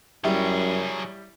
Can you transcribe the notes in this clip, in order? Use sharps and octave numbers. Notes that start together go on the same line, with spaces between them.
F#2 F#3 G3 E4 G4 G#4